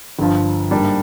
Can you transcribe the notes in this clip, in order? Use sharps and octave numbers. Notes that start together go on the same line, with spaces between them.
G1 G2 F3
G#2 G3 A#3 D4